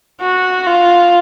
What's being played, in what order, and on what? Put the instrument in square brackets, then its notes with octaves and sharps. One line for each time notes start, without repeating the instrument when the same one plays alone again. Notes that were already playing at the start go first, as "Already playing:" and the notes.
[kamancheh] F#4
F4